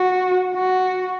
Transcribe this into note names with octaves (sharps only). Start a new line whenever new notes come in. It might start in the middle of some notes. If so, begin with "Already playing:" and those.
Already playing: F#4
F#4